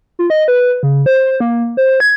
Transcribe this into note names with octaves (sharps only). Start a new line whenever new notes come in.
F4
D#5
B4
C#3
C5
A#3
C5
G#6